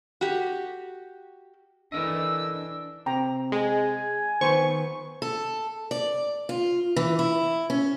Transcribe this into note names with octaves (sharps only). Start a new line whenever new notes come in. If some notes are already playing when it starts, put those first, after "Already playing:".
F#4 G4
E3 D4 A4 A#4 D#5 E6
D4
C3 G5 A#5
G#3 G#4 G#5
D#3 B3 B4 C5 C#6
A4
D5
F4
E3
E4
C#4